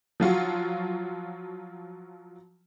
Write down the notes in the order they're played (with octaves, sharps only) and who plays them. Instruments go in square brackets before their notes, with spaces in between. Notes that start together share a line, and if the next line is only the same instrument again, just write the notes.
[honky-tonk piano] F3 F#3 F4 F#4